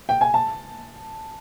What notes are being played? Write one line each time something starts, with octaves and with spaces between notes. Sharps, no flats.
G5
G#5
A5